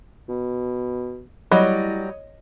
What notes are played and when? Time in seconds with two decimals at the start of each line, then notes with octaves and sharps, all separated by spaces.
0.29 B2
1.51 A2 F#3 G3 C#5 D#5